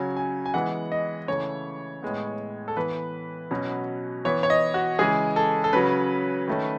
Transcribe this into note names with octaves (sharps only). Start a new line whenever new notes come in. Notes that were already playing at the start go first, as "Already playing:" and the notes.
Already playing: C#3 F#3 C#4 G#5
G#5
G#5
E3 G#3 B3 F#5
D#5
C#3 E3 A3 C#5
A2 G#3 B3
A4
E3 B3 B4
B2 F#3 C#4
E3 B3 C#5
C#5
D#5
F#4
C#3 E3 G#3 G#4
A4
A4
C#3 F#3 C#4 B4
D#3 A3 C#4